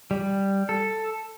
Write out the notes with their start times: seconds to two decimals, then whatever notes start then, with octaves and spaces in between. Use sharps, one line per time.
0.11 G3
0.69 A4